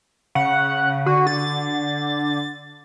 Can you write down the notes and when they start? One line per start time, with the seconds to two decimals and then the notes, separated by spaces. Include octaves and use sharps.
0.35 C#3 F#5
1.06 D3 F#4
1.27 A6